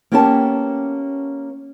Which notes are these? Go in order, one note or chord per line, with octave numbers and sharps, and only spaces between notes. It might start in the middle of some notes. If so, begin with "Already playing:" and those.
A#3 B3 C#4 G4 G#5 A5